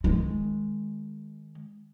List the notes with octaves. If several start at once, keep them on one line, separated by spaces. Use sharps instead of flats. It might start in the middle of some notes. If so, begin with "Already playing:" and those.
D#3 G#3